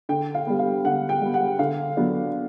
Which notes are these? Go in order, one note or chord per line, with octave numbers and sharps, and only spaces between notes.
D3 G5
F5
G3 B3
F5
D3 F#5
G5
G3 B3
F#5
D3 F5
F#3 B3 D4